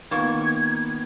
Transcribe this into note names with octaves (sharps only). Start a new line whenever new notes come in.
D#3 E3 A#3 B3 F4 C#6 G#6